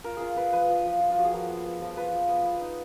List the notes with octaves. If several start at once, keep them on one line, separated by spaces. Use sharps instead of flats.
F4 A#4
F4 G#4 A#4
F4 B4
F3 B4
F3
F3
F4
F4
F3 F#4
G#4
F3 A#4
B3
B3
F3
F4 B4
F3
B3
B3
D#4